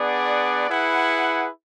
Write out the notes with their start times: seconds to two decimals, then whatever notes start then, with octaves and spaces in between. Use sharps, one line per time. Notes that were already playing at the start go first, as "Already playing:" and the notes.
Already playing: B3 D4 G#4 D5 F#5
0.69 E4 G#4 B4 F#5